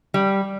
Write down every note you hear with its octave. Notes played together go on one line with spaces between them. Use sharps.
G3